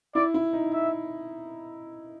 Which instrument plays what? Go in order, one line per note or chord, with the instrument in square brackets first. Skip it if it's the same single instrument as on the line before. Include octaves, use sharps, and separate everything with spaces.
[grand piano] E4 [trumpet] D5
[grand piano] E4
D#4
[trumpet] E5